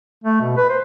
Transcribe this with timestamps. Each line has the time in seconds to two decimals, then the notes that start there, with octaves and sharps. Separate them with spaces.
0.24 A3
0.41 B2
0.57 B4
0.69 C5